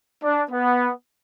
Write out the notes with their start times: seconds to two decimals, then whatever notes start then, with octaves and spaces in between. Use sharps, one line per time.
0.22 D4
0.50 B3